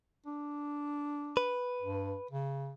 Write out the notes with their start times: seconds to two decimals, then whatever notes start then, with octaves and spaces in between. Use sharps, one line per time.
0.26 D4
1.37 B4
1.82 G2
2.31 C#3